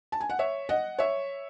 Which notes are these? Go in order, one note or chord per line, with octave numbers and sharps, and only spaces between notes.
A5
G#5
F#5
C#5 E5
D#5 F#5
C#5 E5